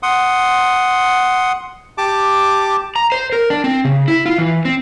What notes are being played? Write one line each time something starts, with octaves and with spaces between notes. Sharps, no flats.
F#5 C6 D#6
G4 A5 D6
A#5
C5
A#4
D4
C4
C#3
E4
F4
E3
C4